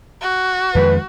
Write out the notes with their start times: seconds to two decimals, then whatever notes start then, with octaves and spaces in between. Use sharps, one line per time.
0.22 F#4
0.75 F2 D#3 G#3 B4